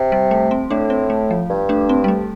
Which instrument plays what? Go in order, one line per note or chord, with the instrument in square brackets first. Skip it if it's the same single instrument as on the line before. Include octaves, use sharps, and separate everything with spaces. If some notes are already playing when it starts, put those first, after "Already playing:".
Already playing: [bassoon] C3
[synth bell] G3
A3
C4
[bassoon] A2 [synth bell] A3 D4
[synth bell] C4
A3
F3
[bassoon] G2
[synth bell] A3 D4
C4
G3
A3